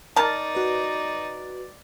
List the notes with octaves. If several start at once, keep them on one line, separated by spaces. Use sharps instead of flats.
D#4 A#4 D5 A5
F#4 B4